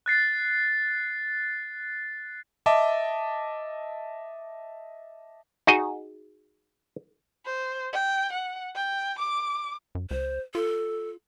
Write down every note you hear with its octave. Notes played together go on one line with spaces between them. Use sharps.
F#6 A6 C7
D#5 E5 A5 D6
D#4 F#4 G#4 D#5
C5
G5
F#5
G5
D6
F#2
C#2 C5
F4 A4